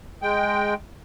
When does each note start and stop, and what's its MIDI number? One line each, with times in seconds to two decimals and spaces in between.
0.22 0.74 56
0.22 0.74 79